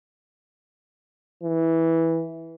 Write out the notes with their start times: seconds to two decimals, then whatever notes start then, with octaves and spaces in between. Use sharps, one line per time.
1.43 E3